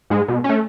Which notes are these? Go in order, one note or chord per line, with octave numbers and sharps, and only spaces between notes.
G#2 G#3
B2
C#4
A3